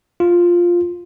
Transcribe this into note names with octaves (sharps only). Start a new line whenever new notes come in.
F4